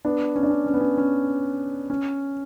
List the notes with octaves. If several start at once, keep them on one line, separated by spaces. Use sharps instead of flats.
B3 D4
C#4
D4
C#4
C#4
B3
C#4
C#4
C#4